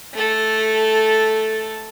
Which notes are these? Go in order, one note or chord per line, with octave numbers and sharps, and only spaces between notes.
A3 A4